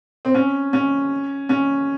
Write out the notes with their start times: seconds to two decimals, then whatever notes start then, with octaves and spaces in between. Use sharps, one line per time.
0.25 C4
0.35 C#4
0.73 C#4
1.49 C#4